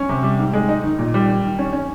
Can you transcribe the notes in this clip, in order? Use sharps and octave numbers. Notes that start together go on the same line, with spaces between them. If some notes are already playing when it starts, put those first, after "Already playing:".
Already playing: C#4
C3
G3
G#2
G#3
D#4
D#3
A#2
G3
D#3
D#3
C#4
C#4